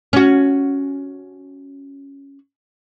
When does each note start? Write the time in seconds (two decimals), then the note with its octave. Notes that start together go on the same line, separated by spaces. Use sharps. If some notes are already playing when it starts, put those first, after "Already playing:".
0.13 C#4 F#4